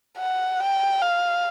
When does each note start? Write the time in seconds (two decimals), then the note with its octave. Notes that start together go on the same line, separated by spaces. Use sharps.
0.18 F#5
0.60 G5
1.02 F5